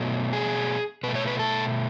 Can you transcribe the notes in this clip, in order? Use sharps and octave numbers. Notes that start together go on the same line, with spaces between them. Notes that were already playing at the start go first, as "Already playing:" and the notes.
Already playing: B2 F#3 A3
G#4
B2 A3 B4
C#5
B4
A4